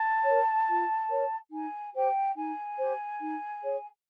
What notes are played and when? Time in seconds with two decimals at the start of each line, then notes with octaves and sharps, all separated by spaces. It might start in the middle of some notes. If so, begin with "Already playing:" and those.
Already playing: A5
0.25 A#4 C#5
0.67 F4
1.09 A#4 C#5
1.51 D#4 G#5
1.93 G4 C5 G5
2.35 D#4 G#5
2.77 G4 C5
3.20 D#4
3.61 G#4 C#5